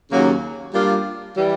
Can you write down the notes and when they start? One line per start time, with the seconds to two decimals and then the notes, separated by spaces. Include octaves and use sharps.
0.10 D#2 C#3 F#3 A#3 C#4
0.73 G3 A#3 D4 F4
1.37 E3 G3